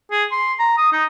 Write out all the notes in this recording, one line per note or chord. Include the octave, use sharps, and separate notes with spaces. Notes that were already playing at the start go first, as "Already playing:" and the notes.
G#4
C6
A#5
D#6
D#4